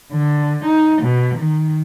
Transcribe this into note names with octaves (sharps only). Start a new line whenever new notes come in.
D3
D#4
B2
D#3